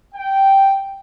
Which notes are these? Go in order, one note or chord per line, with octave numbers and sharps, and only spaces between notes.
G5